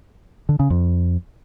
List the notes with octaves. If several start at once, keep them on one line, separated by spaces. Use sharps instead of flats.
D3
C#3
F2